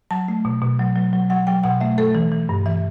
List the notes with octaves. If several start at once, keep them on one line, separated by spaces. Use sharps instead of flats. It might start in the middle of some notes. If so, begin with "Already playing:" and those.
F#3 A5
A3
B2
B2
F#3
F#3
F#3
F#3 F#5
F#3 G5
B2 F#5
A3 E5
A3 A4
E3
E3
G2
E3 E5